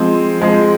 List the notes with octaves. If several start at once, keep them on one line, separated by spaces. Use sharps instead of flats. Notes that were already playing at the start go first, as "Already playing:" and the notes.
Already playing: F3 G#3 C4
F3 G#3 C4